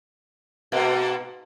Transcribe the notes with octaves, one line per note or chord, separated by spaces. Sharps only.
G#2 B2 A#3